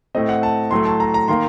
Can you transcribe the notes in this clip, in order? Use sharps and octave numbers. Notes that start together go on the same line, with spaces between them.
A2 A3 C4 D#5
F#5
A5
A2 F#3 A3 C6
A5
A#5
A#5
D#3 A#3 C6